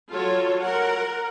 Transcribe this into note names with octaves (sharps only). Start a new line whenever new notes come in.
F#3 F4 A4 C#5
A#4 F#5